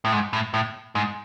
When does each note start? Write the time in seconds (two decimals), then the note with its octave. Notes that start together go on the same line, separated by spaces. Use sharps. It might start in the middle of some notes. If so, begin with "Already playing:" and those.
0.05 A2
0.12 G#2
0.33 A2
0.54 A2
0.95 G#2